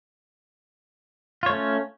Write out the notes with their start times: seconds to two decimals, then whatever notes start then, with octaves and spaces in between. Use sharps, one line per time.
1.43 F4
1.46 C#5
1.50 A3
1.53 C#4